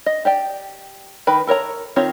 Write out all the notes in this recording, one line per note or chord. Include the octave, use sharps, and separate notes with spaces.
D#5
G4 D5 G5
D#3 B4 G5 B5
A4 A#4 C#5 A#5
D#3 C4 F4 C#5